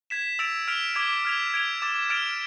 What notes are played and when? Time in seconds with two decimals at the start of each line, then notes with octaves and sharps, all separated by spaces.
0.10 G#6 B6 E7
0.39 E6 A6 D7 F7
0.68 F6 B6 D7 F7
0.95 D6 G#6 B6 F7
1.25 F6 G#6 B6 F7
1.54 G#6 D7 F7
1.82 D6 A6 E7
2.10 F6 A6 D7 F7